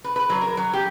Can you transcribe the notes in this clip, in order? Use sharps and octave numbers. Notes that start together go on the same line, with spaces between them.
B4
B4
F#3
A#4
F#3
G4